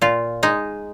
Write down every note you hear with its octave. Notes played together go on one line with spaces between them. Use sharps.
A#2 F4
G#3 D#4